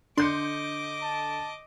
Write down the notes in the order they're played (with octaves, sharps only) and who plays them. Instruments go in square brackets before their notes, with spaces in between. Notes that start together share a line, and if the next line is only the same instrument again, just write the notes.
[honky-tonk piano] D3 G6 C#7 [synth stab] D4 C6 [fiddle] D#5 D6
[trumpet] A5